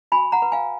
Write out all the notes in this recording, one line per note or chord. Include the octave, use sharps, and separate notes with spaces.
F#4 G#5 B5
F#5 A#5
B4
F5 G#5